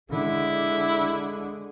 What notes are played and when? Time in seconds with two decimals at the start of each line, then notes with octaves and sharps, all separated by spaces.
0.11 D3 G#3 E4